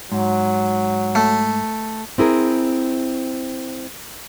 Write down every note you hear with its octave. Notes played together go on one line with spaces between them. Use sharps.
G#2 F#3
A3
C4 E4 G#4 A#4